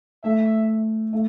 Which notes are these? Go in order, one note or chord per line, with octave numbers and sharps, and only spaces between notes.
A3 E5
A3